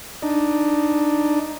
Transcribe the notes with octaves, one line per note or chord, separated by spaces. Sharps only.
D4 D#4